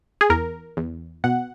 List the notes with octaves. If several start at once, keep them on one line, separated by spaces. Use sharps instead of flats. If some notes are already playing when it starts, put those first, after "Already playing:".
G#4
E2 A#4
E2
B2 F#5